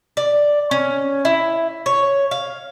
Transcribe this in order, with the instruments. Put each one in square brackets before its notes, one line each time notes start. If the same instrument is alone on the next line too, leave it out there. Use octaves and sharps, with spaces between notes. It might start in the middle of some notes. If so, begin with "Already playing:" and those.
[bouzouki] D5
C#4
E4
C#5
F5